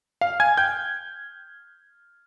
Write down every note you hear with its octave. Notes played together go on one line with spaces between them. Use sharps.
F5 F6
G#5 G#6
G5 G6